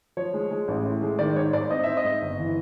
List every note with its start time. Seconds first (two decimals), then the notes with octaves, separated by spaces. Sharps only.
0.17 F3 C#5
0.34 G#3
0.51 G#3
0.68 A1
0.84 A2
1.02 G#3
1.19 D#3 D5
1.36 G#2 C#5
1.53 G#2 D5
1.70 C4 D#5
1.84 C4 E5
1.97 D#5
2.04 G#2
2.22 G1
2.39 E3